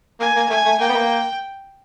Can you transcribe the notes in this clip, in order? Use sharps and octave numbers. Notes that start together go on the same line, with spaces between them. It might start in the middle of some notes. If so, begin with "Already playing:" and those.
A#3 G#5
A#3
A3 G#5
A3
A#3 G5
B3
A#3